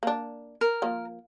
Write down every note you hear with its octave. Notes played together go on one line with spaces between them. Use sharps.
A#3 D4
A#4
F3 A#3